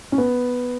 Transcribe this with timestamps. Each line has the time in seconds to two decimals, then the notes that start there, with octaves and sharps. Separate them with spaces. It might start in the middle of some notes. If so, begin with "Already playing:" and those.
0.12 C#4
0.18 B3